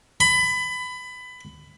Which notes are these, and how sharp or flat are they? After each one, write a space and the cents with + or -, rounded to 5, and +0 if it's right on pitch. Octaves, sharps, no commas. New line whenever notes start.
B5 +20